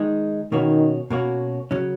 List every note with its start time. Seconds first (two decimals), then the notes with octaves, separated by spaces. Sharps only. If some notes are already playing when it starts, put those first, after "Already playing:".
Already playing: D#3 G#3 D#4 G#4
0.52 B2 D#3 A#3 C#4 F#4
1.10 B2 A#3 C#4 F#4
1.71 C#3 F#3 C#4